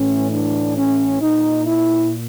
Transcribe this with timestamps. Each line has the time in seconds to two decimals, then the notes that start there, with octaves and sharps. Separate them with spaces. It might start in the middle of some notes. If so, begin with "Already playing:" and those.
Already playing: A2 E3 C#4
0.32 D4
0.77 C#4
1.21 A#2 D#4
1.66 E4